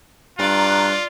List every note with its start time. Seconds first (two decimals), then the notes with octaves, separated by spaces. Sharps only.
0.39 G2 F4 D5 A#5 F#6